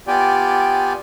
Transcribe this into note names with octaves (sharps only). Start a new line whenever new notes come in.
B3 F4 G4 D5 G5 G#5